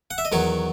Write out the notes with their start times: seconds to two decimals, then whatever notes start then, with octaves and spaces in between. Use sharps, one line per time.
0.11 F#5
0.18 E5
0.25 D#5
0.32 E2 D#3 F#3 C#5